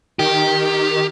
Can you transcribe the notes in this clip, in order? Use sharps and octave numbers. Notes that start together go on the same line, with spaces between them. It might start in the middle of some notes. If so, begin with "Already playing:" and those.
D#3 G4